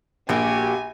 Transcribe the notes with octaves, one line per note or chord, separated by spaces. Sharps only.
A#1 A#3 F#4 G4 G#5